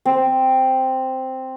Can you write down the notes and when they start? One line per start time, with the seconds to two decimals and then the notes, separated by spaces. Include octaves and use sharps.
0.05 C4